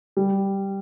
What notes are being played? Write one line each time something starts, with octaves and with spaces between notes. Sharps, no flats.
G3